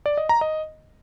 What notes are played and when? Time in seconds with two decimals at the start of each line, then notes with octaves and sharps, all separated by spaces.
0.06 D5
0.18 D#5
0.29 A#5
0.41 D#5